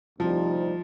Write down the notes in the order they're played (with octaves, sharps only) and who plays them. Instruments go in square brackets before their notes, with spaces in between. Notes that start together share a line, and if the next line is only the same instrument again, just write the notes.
[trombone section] D2 C3 G3 C4 D#4 [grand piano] F3